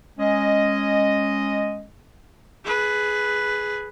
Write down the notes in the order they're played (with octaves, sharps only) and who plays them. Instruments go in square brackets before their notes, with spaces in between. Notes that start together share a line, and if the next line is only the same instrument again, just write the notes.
[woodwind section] G#3 C#4 D#5
[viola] G#4 B4